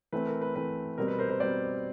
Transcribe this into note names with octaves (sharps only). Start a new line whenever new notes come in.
E3 A3 C4 B4
A#4
B4
E3 A3 C4 B4
B2 G3 C4 A#4
B4
A#4 C5
A#4 C5
B2 G3 C4 C5 D5